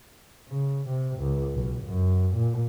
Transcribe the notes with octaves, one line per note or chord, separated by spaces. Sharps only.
C#3
C3
C#2
B1
F#2
A#2